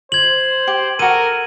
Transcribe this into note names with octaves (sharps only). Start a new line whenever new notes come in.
C5 G#6 F#7
G4
F#4 A4 A#4 D#7